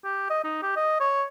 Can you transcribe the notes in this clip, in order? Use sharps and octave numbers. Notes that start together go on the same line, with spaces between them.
G4
D#5
D#4
G4
D#5
C#5